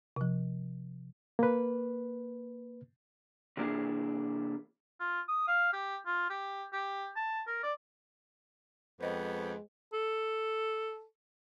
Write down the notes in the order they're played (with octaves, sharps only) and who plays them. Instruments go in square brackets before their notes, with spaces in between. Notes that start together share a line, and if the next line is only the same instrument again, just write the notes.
[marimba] C3 F3
[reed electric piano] A#3 B4
[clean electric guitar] C3 E3 A#3 D4 E4 G#4
[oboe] F4
D#6
F5
G4
F4
G4
G4
A5
A#4
D5
[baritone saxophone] F2 [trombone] G#3 [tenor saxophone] B3 [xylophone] C5 D#5 G5
[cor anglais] A4